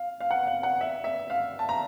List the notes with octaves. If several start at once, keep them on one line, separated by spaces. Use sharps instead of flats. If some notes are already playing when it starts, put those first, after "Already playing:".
Already playing: F5
F5
F#5
F5
F#5
E5
E5
F5
A5
A#5